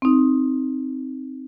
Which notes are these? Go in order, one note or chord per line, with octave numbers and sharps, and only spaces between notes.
C4 D#4